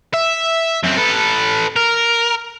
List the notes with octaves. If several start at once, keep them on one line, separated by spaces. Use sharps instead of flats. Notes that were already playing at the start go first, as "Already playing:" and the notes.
E5
F#2 C4
A4 B4
A#4